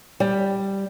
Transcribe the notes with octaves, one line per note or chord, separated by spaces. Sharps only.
G3